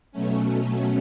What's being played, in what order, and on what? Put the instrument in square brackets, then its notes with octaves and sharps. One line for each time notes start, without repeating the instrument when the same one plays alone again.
[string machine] B2 F#3 A3 C#4